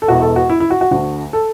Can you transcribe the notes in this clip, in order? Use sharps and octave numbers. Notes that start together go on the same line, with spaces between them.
A4
E1 E2 B2 F#4
A4
F#4
E4
E4
F#4
F#4
D2 D3 F#4
A4